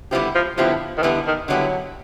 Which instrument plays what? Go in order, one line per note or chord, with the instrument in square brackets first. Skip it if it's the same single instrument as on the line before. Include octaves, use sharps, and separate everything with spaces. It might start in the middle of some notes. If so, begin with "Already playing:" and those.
[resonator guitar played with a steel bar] D3 G3 B3 E4 G4 [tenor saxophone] F3
[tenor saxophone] F3
[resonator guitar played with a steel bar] D3 G3 B3 E4 G4 [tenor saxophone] F3
[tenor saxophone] D#3
[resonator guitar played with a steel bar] D3 G3 B3 E4 G4 [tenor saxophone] E3
[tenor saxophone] D#3
[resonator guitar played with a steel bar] D3 G3 B3 E4 G4 [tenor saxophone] F#3